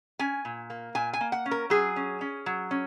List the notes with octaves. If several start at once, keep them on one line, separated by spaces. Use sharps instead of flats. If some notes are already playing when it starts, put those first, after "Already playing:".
C#4 G#5
A#2
A#3
A#2 G#5
G#5
A#3
F#5
C#4
A#4
F#3 G#4
C#4
C#4
F#3
C#4